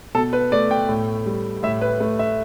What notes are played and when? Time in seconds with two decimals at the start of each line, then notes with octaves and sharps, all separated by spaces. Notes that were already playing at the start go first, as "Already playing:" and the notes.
0.14 B2 A4
0.33 B4
0.52 A3 D5
0.71 G5
0.89 A2
1.26 G3
1.63 A2 E5
1.81 B4
2.00 A3
2.19 E5